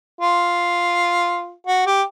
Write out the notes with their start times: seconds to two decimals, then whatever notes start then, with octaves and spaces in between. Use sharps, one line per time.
0.21 F4
1.67 F#4
1.86 G4